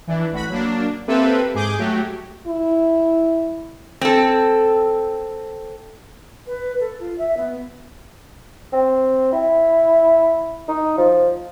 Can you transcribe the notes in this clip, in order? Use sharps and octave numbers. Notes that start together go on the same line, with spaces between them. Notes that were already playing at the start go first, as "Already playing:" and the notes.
E3 D4 E4
A1 F#4 B5
F#3 A#3 D4
A#3 C4 G4 A4 B4 E5
G#2 G#4 D6 G6
F#3 A3 F#4 G4
E4
C4 A4
B4
A4
F4
E5
B3
C4
E4
D#4
F3